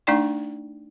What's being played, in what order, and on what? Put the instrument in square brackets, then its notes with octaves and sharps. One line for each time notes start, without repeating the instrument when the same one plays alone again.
[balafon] A3 D4 D#4 D5 G5 C#6